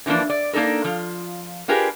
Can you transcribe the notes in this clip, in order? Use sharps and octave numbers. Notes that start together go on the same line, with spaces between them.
D3 E3 F3 A#3 D4
D5
A#3 D4 D#4 A4 A#4
F3 F4
D4 F4 G4 G#4 A#4 B4